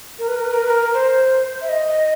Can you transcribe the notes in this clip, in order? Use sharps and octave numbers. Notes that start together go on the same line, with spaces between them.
A#4
B4
A#4
B4
A#4
B4
A#4
C5
E5
D#5